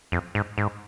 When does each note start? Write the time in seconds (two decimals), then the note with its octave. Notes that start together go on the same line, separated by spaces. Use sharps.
0.12 F2
0.35 G#2
0.58 G#2